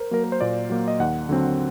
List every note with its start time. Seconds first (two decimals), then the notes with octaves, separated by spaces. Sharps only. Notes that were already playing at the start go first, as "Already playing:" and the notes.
Already playing: A#4 C5
0.11 F#3 A#3 A#4
0.24 A#4
0.32 C5
0.41 A#2 D5
0.70 F#3 A#3
0.88 D#5
1.00 D#2 F#5
1.29 D3 F#3 C4